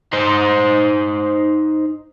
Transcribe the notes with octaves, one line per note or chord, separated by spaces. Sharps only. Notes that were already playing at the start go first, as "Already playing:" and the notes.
D#4 C5